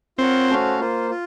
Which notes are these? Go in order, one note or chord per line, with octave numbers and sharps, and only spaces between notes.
C4 F4 A#4 C#5 F#5
A3 C#4 F#4 C5 F5
A#3 F4 C5
F4